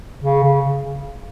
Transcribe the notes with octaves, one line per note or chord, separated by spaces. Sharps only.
C#3
C#3